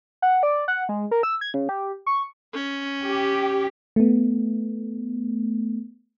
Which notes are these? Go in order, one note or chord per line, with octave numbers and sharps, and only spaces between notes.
F#5
D5
F#5
G#3
A#4
E6
G#6
C#3
G4
C#6
C#4
G4
A3 B3